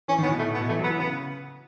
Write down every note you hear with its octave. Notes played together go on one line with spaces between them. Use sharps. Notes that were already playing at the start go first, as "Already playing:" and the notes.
E3 C#4
D#3
A2 B3
B2
A2 A3
B3
B2
E3 A3
F#3
B3
E3
C#3 B3